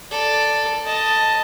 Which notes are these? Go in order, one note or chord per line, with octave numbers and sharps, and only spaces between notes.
A4 D5
D#5 A5